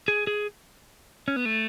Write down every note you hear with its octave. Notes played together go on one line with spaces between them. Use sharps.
G#4
G#4
C#4
B3
A3